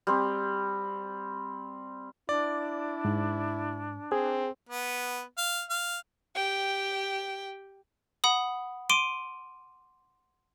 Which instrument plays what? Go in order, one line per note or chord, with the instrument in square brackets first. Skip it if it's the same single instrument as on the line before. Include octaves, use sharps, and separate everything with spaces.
[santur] G3 C4
[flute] D4 [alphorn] E4 [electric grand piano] D5
[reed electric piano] G#2
[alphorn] C4 [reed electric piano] G#4
[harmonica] B3
F5
F5
[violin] G4 G5
[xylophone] F#5 B5 D#6
C6 D6 D7 D#7